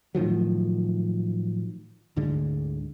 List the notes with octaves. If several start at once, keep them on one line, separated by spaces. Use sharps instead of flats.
A2 D#3 F3 F#3
D2 G#2 D3 G#3